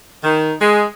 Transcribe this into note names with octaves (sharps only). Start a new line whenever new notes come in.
D#3
G#3